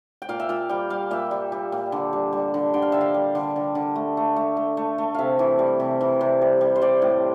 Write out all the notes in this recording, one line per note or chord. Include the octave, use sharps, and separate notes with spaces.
G5
A#2 F5
E5
A#2 F5
G3 G5
G3 F5
A#2 E5
G3
G3
A#2
D3
G3
G3
D3
D3 G5
F5
D3 E5
F5
G3
D3
D3
D3
A3
A3
A3
A3
A3
A3
C3 E5 F5
E3
G3
C3
E3
C3
G3
G3
C5
G3 D5
A2